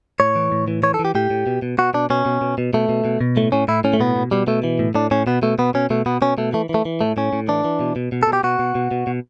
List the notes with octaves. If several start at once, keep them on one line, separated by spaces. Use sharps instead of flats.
A2 C#5
E3
A2
E3
E3 C#5
A4
E3
G4
A2 G4
A2
B2
B2
B2 F#4
B2 D4
B2 C#4
B2
B2
B2
B2 A3
B2
B2
B2
A2 A3
A2 C#4
A2 E4
A2 C#4
A3
B2 B3
B2
B2 G3
B2 A3
E3
A2
A2 D4
A2 C#4
B2 B3
B2 A3
B2 B3
B2 C#4
B2 A3
B2 B3
B2 C#4
B2 A3
E3 A3
E3
A3
E3
A2 A3
A2 C#4
A2
E3 D4
E3
B2
B2
B2
A4
B2
G4
B2 F#4
B2
B2
B2
B2